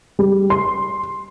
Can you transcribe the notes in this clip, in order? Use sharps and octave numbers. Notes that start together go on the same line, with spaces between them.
G3
C6